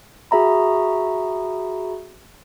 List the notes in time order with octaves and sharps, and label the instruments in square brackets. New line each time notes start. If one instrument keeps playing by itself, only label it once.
[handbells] F#4 G#4 E5 A#5 B5